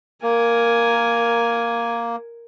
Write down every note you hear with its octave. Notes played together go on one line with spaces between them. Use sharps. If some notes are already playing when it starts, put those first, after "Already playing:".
A#3 A#4 G#5